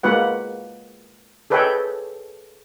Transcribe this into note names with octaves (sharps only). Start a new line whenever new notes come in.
G#3 A#3 F#4 B4 F#5
G#4 A4 B4 C#5 D#5 G5